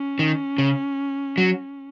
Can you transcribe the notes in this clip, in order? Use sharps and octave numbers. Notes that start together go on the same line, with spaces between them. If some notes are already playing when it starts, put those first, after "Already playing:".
Already playing: C#4
D#3
C#3
F#3